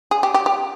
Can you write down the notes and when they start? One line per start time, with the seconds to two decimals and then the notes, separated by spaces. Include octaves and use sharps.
0.11 G#4
0.23 G4
0.34 G4
0.46 G4